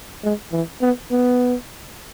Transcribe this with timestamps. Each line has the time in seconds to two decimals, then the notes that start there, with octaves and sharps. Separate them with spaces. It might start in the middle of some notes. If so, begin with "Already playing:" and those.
0.24 G#3
0.52 E3
0.81 B3
1.11 B3